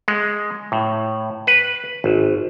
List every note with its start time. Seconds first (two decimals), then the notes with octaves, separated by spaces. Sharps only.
0.08 G#3
0.72 A2
1.47 B4
2.04 G#1